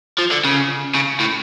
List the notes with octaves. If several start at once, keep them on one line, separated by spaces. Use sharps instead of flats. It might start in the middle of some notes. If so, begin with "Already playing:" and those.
F3
D3
C#3
C#3
A2